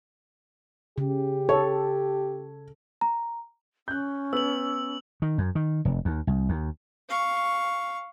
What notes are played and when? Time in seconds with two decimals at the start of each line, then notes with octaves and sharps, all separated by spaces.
0.98 C#3 G4
1.49 A4 C#5
3.01 A#5
3.88 C#4 F#6 G6
4.33 B3 E6 F#7
5.22 D#3
5.38 F#2
5.55 D#3
5.85 F1
6.05 D#2
6.27 C2
6.49 D#2
7.10 F5 C#6